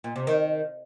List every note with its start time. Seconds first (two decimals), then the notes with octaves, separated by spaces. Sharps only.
0.04 A#2
0.16 C3
0.27 D#3